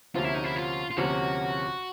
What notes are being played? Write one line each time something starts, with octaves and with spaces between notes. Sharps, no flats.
D2 C3 F3 A#3 C#4 F4
E4
D#4
E4
F4
F4
D2 C3 F3 A#3 C#4 F#4